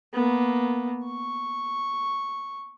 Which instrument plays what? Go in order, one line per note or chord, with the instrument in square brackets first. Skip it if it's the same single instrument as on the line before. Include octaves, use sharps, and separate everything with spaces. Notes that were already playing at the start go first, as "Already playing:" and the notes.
[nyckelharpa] A#3 B3
C#6